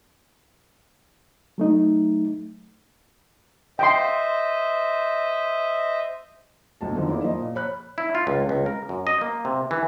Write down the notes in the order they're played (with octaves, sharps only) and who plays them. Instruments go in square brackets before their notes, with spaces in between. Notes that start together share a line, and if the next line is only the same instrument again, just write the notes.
[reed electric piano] F#3 A3 D#4
[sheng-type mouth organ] C5 D#5 E5 [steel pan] G5 C6
[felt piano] D2 B2 A5
F2 D3 D#3 F3
D#3 A#3 E4 G#4 D5
F3 A#3 D#5
A#2
C#5 B5 F#6
[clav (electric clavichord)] E4
F4
C#2
C#2
A#4
F#2
D#5
A#3
C3
E3